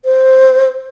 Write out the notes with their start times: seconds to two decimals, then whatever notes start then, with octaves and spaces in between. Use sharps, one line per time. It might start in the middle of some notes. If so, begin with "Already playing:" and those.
0.05 C5